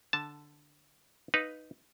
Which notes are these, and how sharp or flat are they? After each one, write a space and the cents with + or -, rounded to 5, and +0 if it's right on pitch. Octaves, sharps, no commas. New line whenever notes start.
D3 +5 A5 +0
D#4 +0 B4 +0 F5 +0